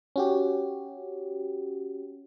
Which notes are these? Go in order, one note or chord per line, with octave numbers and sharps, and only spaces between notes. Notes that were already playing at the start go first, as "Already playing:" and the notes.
C#4 F#4 G4